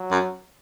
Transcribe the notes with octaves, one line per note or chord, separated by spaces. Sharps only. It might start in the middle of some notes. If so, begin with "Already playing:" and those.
Already playing: F#3
F#2